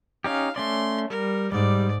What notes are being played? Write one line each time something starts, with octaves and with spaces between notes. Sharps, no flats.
C#4 D#4 G4 F5
A3 C#4 D5 C6
G3 A#4
G#2 G3 D5